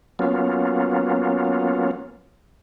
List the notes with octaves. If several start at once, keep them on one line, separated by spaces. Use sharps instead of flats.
F#3 A#3 B3 C#4 F4